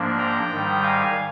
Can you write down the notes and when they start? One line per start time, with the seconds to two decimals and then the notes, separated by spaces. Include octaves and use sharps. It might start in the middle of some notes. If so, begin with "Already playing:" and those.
Already playing: G#2 F3 A#3 D4
0.18 G5 A#5
0.51 G#2 D#3 G3
0.83 F5 G#5